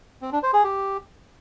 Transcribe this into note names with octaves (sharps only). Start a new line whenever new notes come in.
C4
D4
C5
G#4
G4